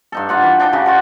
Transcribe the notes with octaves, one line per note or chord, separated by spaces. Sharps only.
G2 D#4 A4
D#4 F4 F#5
E3 B5
D4 D#4 G5 A5
C#3 D#4 F#4 G4
D4 F4 F#4